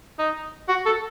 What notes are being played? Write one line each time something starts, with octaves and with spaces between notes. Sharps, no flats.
D#4
F#4
A4